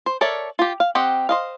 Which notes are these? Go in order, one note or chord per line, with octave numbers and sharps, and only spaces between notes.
C5
A4 A#4 C#5 D5 E5
F4 G4
F5
C4 G4 D#5 F#5
C5 D#5 F5